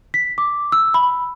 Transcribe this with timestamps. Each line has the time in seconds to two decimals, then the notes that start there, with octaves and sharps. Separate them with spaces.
0.14 B6
0.38 D6
0.72 E6
0.94 B5